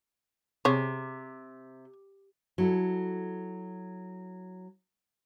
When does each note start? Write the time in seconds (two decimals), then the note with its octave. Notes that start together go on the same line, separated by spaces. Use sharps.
0.65 C3 G#4 C#5
2.58 F#3 E4 A4